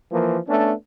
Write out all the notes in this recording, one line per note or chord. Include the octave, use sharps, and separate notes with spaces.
E3 F3 A#3
A3 B3 C#4 D4